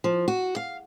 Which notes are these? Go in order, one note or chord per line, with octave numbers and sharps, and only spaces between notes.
F3
F#4
F5